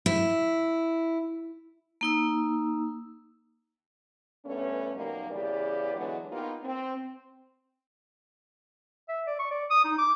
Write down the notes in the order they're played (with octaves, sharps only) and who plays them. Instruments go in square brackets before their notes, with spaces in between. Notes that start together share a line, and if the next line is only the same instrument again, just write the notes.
[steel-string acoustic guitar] E4
[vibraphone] A#3 D#4 E6
[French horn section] G2 A3 B3 C#4
B2 D#3 F#3 G3 A#3
E2 C#3 G4 B4 D5
D3 E3 F#3 G#3 B3 D4
A#3 B3 D#4 F4 G4
C4
[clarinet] E5
D5
C#6
D5
D#6
D#4
D6